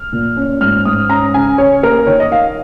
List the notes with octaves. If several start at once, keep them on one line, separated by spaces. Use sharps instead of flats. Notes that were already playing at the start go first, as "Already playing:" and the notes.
Already playing: F6
A#2
C#4
G#2 F6
G#2 D#6
C#4 A#5
C#3 G#5
C#3 C#5
A#3 A#4
D#3 C#5
D#5
D#3 F5